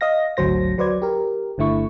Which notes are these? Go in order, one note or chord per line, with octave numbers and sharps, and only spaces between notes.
D#5 F5 A#6
G#1 D2 F#3 C5 A#6
F#3 B4 C5 D5 G#6
G4 A#4
G1 D3 A3 E4 C#6